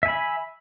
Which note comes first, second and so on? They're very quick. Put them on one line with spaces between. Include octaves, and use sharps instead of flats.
E5 G#5 B5